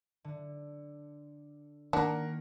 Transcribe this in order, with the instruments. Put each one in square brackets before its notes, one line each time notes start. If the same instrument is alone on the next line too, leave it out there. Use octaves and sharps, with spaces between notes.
[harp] D3
[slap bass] D#3 A#3 [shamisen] D4 [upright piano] A#4 F#5